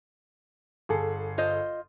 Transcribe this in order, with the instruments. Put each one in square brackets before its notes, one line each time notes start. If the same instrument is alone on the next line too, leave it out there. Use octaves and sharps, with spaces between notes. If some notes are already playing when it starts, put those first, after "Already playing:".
[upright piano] G1 G#4 A4
[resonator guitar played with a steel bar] F4 C5 D#5